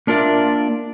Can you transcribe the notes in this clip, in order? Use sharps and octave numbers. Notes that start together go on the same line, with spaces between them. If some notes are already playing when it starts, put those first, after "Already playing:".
A#3 D4 F4 A#4 D5 E5